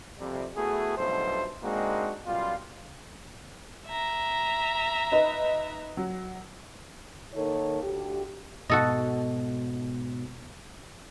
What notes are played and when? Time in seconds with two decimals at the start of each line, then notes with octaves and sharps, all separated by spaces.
0.19 F2 C3 G3
0.56 A3 B3 E4 F#4 G#4
0.97 B1 G2 B2 F3 A3 C5
1.63 G#3 A#3 C4 D4 D#4 F#4
2.26 F#2 B2 G3 F4
3.87 E5 A#5
5.12 D#4 B4 D#5
5.97 F#3
7.34 D#3 A#3 D#4 A4 C#5
7.83 D2 G4
8.70 G#2 B2 F#4 A4 D#5